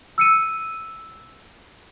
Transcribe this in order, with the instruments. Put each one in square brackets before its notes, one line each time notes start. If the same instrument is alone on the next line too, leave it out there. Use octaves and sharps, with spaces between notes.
[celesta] E6 C#7 D#7